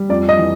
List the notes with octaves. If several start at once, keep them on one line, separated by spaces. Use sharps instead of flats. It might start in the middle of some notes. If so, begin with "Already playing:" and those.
Already playing: G3
F2 D5
D#5
E3